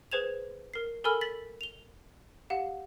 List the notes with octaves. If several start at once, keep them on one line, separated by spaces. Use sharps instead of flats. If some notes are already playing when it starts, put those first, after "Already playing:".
G#4 B4 C5 G#6 E7 F7
A#4 C7
A4 A#4 G#5 B5 E6 F6
A6 B6 F#7
F7 G7
G4 F5 F#5